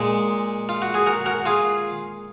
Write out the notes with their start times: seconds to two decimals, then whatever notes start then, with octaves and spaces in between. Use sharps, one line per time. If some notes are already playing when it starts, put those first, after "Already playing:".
Already playing: A#2 G#3
0.69 F4
0.82 F#4
0.94 G#4
1.07 F#4 A#4
1.26 F#4 A#4
1.46 F4 G#4